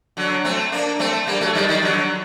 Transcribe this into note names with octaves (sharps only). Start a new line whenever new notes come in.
D3 F#3
A3 C4
A#3 D4
A3 C4
G3 A#3
F#3 A3
D#3 G3
D#3 G3
D3 F#3